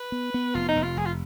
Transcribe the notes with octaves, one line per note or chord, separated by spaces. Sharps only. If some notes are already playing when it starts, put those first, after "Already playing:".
Already playing: B4
B3
B3
F1 F4
D#4
F1
F4
F1 G#4
F4